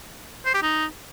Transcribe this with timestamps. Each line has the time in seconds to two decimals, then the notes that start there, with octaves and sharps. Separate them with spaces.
0.46 C5
0.54 G4
0.63 D#4